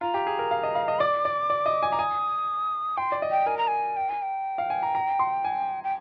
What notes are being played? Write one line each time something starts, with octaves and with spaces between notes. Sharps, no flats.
F4 A#5
G4
G#4
A#4
F5
D#5
F5
D#5
D5 D6
D5
D5
D#5
G#5
A#5 D6
G#5 D#6
G5 C6
D5
D#5
G5
A#4 G#5
A#5
G#5
G5
G#5
G5
F5
G#5
A#5
A#5
C6
G#5
G5